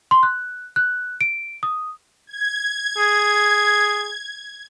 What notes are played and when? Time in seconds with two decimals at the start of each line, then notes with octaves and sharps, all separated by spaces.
0.11 C6
0.23 F#6
0.76 F#6
1.21 D7
1.63 D#6
2.27 G#6
2.97 G#4